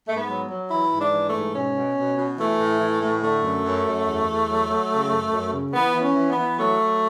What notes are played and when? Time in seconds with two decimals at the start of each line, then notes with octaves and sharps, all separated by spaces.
0.08 G#2 A3
0.16 B3
0.29 F#3
0.50 F#3
0.70 E3 E4
0.92 G#2
0.99 D4
1.12 E3
1.27 A3
1.34 G#2
1.55 B2 C#4
1.76 B2
1.96 B2
2.17 B2
2.38 E3 A3
2.59 A2
2.80 E3
3.01 A2
3.22 D3 A3
3.43 F#2
3.65 F#2
3.86 F#2
4.06 E2
4.27 E2
4.48 F#3
4.69 F#3
4.90 C#3
5.11 F#2
5.32 F#2
5.52 C#3
5.73 E3 B3
5.95 E3
6.02 C#4
6.15 E3
6.30 B3
6.37 E3
6.58 F#3 A3
6.79 F#3